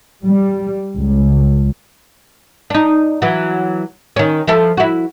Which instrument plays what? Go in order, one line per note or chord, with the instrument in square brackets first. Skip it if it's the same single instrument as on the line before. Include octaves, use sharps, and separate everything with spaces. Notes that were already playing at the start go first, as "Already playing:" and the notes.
[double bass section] G3
C#2
[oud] D4 D#4
E3 F#3
D#3 C#4
F3 E4 A4
E4 F#4